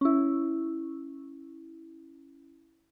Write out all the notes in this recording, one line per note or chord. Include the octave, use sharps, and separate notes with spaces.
C#4 E4